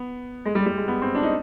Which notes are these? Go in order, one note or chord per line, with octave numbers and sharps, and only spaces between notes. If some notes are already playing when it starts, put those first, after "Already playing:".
Already playing: B3
G#3
G3
G3
G#3
B3
C4
D4
D#4